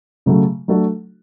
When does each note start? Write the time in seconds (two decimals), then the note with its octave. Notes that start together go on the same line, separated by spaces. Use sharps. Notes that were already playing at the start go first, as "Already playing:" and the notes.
0.26 C#3 F#3 A3
0.68 F#3 A3 D4 F#4 A4